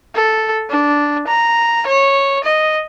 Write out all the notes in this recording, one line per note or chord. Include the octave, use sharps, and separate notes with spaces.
A4
D4
A#5
C#5
D#5